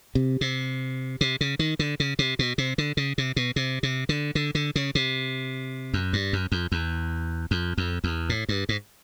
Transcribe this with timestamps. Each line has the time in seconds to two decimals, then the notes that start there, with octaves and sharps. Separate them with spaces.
0.15 C3
0.41 C3
1.21 C3
1.41 C#3
1.59 D#3
1.79 D3
2.00 C#3
2.19 C3
2.39 B2
2.58 C3
2.78 D3
2.97 C#3
3.18 C3
3.36 B2
3.56 C3
3.83 C3
4.09 D3
4.35 D3
4.55 D3
4.76 C#3
4.95 C3
5.94 F#2
6.13 G2
6.33 F#2
6.52 F2
6.72 E2
7.51 F2
7.78 F2
8.04 E2
8.29 A2
8.49 G2
8.69 G#2